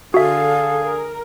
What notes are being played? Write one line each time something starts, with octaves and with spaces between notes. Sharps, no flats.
D3 F#4 G#4 A4 E5 F5
A#4